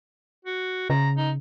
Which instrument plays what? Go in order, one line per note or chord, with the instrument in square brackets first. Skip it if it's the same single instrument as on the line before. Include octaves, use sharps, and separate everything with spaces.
[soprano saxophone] F#4
[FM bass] C#3 [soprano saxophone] A#5
[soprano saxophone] D#4